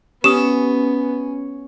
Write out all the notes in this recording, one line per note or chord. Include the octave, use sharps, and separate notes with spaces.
B3 C#4 G4 D#6 E7